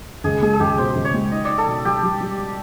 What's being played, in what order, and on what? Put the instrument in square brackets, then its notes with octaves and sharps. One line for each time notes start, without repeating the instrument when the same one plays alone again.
[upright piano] C#2 [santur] G#4
[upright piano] G#3 [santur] G#4
[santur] G#4
[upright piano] C#2 [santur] G4
[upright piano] B2 [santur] C5
[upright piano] C#2
[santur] C#5
[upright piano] G#3
[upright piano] D#4 [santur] D#5
[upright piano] D#4 [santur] D5
[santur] A4
[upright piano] B2
[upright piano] G3 [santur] G4
[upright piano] G3
G3